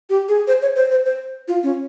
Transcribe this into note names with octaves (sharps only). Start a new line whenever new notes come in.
G4
G#4
C5
C#5
C5
C5
C5
F4
C#4